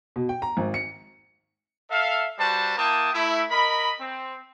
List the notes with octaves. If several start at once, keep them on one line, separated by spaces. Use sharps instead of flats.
B2
G5
A#5
G#1
C#7
A4 E5 F5
G3 F#4 B4 C5 A5
A#3 E4 G5 A5 D#6
A3 E4
A#4 D#5 B5
C4